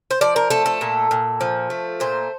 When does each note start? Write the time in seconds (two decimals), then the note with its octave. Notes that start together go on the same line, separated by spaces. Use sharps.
0.11 C5
0.21 F3 D5
0.36 A#4
0.50 A3 A4
0.66 A4
0.81 A#2
1.11 A#2
1.41 F3
1.70 A3
2.00 A#2 C5